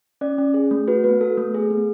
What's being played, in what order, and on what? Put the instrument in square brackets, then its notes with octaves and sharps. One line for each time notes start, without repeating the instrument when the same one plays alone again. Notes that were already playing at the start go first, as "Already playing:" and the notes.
[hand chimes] C#4 D5
C#4
G#4
A3
F#4 B4
B3 B4
A4
A3
G#4
B3